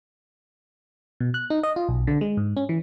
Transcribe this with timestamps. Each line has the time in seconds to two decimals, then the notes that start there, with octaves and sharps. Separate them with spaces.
1.20 B2
1.34 F#6
1.50 D#4
1.63 D#5
1.76 F4
1.88 B1
2.07 D3
2.21 G#3
2.37 G#2
2.57 C#4
2.69 E3